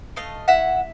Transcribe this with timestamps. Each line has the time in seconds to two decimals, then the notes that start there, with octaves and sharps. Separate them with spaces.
0.16 A3 D#5 F5
0.48 E4 E5 F#5